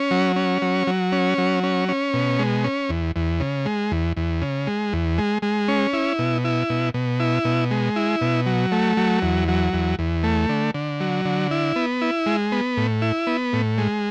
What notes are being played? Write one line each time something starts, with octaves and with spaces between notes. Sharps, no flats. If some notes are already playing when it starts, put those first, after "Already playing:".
Already playing: C#4
F#3
C#4
F#3
F#3
C#4
F#3
C#4
C#4
B2
G#3
C#4
E2
E2
C#3
G#3
E2
E2
C#3
G#3
E2
G#3
G#3
C#4
E4
B2
E4
B2
B2
E4
B2
G#3
E4
B2
F#3
A3
F#3
E2
F#3
E2
E2
A3
D3
D3
F#3
D3
E4
B3
E4
G#3
B3
A2
E4
B3
A2
G#3